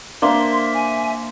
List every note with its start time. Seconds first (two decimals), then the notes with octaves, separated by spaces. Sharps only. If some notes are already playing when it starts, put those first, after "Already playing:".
0.22 A#3 D4 C5 E5 C6
0.74 G#5